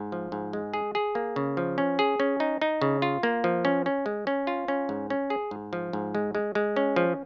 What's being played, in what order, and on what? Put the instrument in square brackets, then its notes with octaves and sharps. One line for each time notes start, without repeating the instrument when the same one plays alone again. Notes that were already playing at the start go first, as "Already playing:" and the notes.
Already playing: [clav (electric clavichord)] G#2
F3
G#2
G#3
G#4
G#4
A#3
C#3
F3
C#4
G#4
C#4
D#4
D#4
C#3
F4
A#3
F3
C#4
C#4
G#3
C#4
F4
C#4
G#2
C#4
G#4
G#2
F3
G#2
G#3
G#3
G#3
C#4
F3